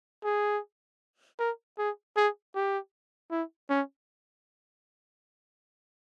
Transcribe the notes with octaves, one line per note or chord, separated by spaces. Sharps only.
G#4
A#4
G#4
G#4
G4
E4
C#4